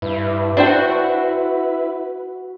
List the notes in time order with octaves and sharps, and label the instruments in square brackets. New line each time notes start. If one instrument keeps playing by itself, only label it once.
[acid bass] G2 [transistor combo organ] E4 B4
[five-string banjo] D4 C5 G5 [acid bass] F#4